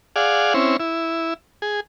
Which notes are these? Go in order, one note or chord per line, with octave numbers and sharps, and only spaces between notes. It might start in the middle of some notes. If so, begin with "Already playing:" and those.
G#4 D5 F5 F#5
C4 C#4 E4
E4
G#4